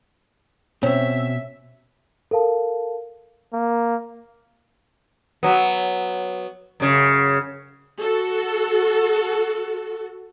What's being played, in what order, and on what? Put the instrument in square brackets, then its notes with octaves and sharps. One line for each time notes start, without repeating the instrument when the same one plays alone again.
[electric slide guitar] B2 [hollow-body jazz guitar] C4 [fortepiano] C#4 [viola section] E5
[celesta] A4 A#4 F5 A5
[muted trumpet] A#3
[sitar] F#3 B3
F#2 C#3
[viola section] F#4 A4